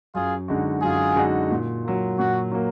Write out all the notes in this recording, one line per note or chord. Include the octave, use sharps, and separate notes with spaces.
F#2 F4 G#4
D3 G#3 D#4 F#4
F#2 F4 G#4
D3 G#3 D#4 F#4
A#2
F#3 A#3
A#2 F#4
F#3 A#3